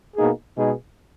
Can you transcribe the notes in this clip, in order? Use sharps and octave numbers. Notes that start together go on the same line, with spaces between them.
B2 A#3 D#4 G#4
B2 G#3 D#4 G#4